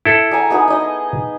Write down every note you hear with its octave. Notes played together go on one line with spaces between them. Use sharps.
E4 A4
G#4 G#5 A#5
B3 D#4 G#4
D#4 D#5